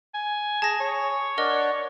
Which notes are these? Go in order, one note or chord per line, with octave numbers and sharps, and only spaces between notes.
G#5
G#4 A5 A#6
G#4 C#5
D4 A#4 D5 D#5 F#5